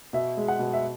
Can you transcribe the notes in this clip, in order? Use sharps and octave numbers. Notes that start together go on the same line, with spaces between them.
B2 E5
G#3
F#5
B2
E5